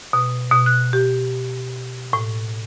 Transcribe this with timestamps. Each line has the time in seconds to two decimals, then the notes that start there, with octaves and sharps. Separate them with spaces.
0.13 B2
0.52 B2
0.66 F#6
0.93 G4
2.13 A2